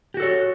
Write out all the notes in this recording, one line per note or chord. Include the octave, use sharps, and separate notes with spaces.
F#4 G4 A4 C#5